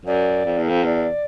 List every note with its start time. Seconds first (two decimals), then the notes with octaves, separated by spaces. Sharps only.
0.05 F#2 D5
0.45 F2
0.58 E2
0.69 F2
0.84 E2 D5